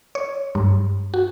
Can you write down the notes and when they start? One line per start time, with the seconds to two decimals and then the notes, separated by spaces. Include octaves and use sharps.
0.15 C#5
0.55 G2
1.14 F#4